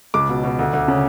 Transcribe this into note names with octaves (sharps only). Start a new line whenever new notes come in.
C#2 D6
B2
B2
D2
D2
C#3